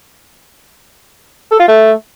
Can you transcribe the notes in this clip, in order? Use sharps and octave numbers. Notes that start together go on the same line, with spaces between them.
A4
F4
A3